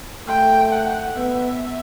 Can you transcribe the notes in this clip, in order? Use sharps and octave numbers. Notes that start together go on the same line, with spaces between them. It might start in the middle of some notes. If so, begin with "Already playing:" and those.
A3 G5
F#5
B3 E5